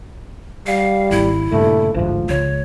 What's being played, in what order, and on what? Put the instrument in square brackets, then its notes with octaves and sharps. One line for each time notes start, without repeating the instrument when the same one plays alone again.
[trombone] G3 [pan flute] F5
[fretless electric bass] G#1 [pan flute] E4
[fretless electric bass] G2 A#2 C#3 [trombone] A3
[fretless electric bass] A1 D2 G#2 [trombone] F3
[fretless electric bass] C#2 [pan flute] C#5